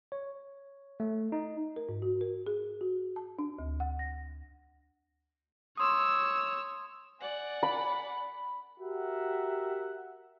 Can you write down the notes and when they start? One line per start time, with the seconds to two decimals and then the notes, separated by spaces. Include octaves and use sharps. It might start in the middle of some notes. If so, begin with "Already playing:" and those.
0.12 C#5
1.00 A3
1.32 D#4
1.76 A#4
1.89 G#2
2.02 F#4
2.21 A#4
2.47 G#4
2.81 F#4
3.16 A5
3.39 D4
3.59 D2
3.80 F#5
3.99 A#6
5.77 C#5 C6 D#6 E6
7.20 D5 F#5 G#5
7.63 B5
8.80 F#4 G4 A#4 E5 F#5